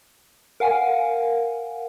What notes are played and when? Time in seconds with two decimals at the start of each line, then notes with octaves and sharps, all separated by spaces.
0.60 A#4 F5 F#5 G#5